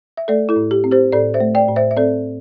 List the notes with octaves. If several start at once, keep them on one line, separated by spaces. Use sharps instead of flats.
E5
A3 A4 D5
E4 A4
A2
G4
C4
G4 C5
A2 A4 D5
C5 E5
A3
D5 G5
A2
C5 E5
E5
C4 A4 D5